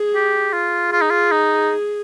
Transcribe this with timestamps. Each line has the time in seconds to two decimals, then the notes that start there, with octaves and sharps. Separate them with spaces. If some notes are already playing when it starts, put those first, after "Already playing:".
Already playing: G#4
0.14 G4
0.53 F4
0.92 F4 G#4
1.01 D#4
1.10 F4
1.32 D#4